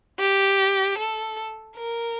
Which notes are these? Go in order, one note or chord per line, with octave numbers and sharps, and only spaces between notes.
G4
A4
A#4